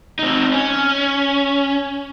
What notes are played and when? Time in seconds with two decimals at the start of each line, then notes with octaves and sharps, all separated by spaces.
0.19 C4 D#4
0.53 C#4